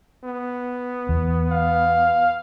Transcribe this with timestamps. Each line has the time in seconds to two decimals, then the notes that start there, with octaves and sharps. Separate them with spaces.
0.24 B3
1.09 E2
1.51 F5